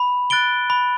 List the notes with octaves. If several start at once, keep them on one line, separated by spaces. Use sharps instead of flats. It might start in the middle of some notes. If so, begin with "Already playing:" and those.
Already playing: B5
F#6 A6 D7 G7
B5